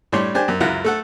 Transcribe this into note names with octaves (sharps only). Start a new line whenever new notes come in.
A2 G3 D4 C#5 C6
D4 G4 C5 G#5
F#2
C#2 F#2 F#3 E4 F4 F#5
A3 A4 F#5